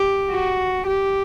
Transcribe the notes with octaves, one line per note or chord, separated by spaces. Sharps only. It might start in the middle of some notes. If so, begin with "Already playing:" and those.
Already playing: G4
F#4
G4